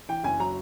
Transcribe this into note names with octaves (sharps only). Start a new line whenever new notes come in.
E3 G5
F#1 G#5
F#3 A#5